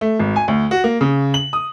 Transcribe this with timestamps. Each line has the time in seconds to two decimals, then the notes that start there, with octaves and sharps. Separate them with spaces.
0.01 A3
0.19 G#1
0.36 G#5
0.48 D2
0.71 F#4
0.84 A#3
1.01 C#3
1.34 F#7
1.53 D#6